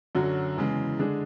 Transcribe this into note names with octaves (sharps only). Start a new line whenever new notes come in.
F#2 D3 F#3 C#4 F#4
E2 C#3 E3 G#3
D3 G#3 D4 G#4